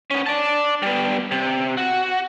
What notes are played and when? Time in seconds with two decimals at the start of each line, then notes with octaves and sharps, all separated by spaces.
0.11 B3 C#4
0.26 D5 A5
0.83 G3 B3
1.31 C3
1.77 F#4